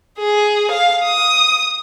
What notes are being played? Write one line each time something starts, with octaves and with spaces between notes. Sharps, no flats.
G#4
F5
D#6